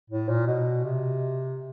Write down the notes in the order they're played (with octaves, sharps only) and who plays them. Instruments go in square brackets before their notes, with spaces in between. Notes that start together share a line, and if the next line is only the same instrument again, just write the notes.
[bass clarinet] A2
A#2
B2
C3